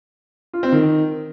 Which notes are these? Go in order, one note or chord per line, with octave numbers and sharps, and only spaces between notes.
F4
C4
D#3